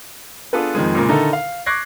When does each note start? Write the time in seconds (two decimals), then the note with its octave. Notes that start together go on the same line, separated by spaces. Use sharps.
0.53 B3 D4 F4 G#4 A4 B4
0.75 F2 D#3 F3 G#3
0.95 A#2 C#3 F3 G#3 A#3
1.09 D3 D#3 D#4 E4 A4 A#4
1.33 F5
1.66 C#6 D6 F#6 G#6 A#6 C7